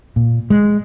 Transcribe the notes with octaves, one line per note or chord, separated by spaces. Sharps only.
A#2
G#3